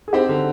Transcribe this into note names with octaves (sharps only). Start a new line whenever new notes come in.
G#4
C4 D#4 G4
D3